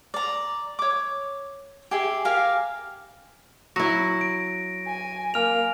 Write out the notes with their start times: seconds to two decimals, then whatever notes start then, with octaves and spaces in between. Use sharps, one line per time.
0.14 D5 A#5
0.79 C#5 D6
1.91 G4 G#4 E5
2.25 G4 A#4 F5 G#5
3.76 F#3 E4 A#6
4.21 D7
4.86 G#5
5.34 A#3 G#5 F6 F7